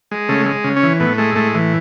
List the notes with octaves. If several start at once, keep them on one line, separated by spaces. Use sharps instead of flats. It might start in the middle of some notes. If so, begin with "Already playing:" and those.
G#3
C#3 A3
G#3
C#3
C#4
E3
A2 B3
G#3 A3
A2 A3
E3